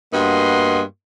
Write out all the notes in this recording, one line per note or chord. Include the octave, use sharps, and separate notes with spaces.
G2 A#3 B3 F#4 D#5 C6